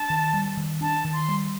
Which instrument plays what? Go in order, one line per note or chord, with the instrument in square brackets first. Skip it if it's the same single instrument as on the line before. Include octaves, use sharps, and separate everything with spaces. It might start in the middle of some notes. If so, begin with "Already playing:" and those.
Already playing: [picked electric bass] D4 [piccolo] A5
[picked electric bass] D#3
G3
D#3
[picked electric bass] D4 [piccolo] A5
[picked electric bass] D#3
[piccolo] C6
[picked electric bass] G3